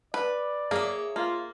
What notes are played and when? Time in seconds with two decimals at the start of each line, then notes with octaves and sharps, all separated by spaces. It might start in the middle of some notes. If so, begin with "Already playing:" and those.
0.14 B4 D5
0.71 A#3 G#4 C#5 E5
1.16 A#3 F4